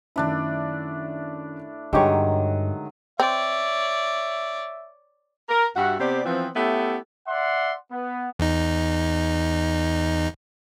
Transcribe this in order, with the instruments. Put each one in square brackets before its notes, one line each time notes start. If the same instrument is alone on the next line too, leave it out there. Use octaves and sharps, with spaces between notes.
[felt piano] F#2 D#3 [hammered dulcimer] A3 D4 E4
[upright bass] G2 [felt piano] D3 [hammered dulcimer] D#3 F#3 [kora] G#3 G4 C#5
[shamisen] C4 [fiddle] C#5 D5 [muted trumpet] E5
[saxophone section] A#4
G2 F#4 E5
C3 B3 C4 G4 D5
E3 F3 B3 C4
A3 B3 C#4 E4 G4 A4
[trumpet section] D5 E5 F#5 C6
B3
[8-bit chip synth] E2 D#4